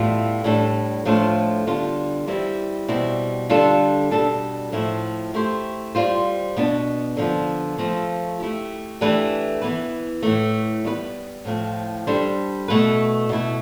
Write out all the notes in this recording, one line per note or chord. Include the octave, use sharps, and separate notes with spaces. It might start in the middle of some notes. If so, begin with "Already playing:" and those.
Already playing: A2 E3 G3 B3 F4
A2 G3 D4 A4
A2 F3 A3 D4 F4
D3 G3 B3 D4 F4
E3 G3 C4 E4 G4
B2 G3 C4 E4
D3 G3 D4 F4 A4
B2 G3 D4 A4
A2 F3 A3 E4
A3 E4 G4 C5
G3 C4 F4 C5
B2 B3 D4
D3 F3 B3
F3 A3 C4 F4
A3 E4 G4
E3 A3 D4 G4 B4
E3 B3 E4 B4
A2 E3 A3
G3 B3 E4 B4
A2 F3 A3 C4
G3 D4 A4 C5
B2 A3 E4 B4
B2 A3 E4